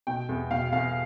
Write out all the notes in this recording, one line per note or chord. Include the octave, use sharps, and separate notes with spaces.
B2 G5
E2
B2 F5
E2 F5